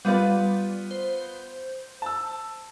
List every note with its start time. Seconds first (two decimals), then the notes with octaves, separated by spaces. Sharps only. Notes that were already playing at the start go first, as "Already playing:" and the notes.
0.05 G3 B3 F4 B4
0.91 C5
2.02 A5 E6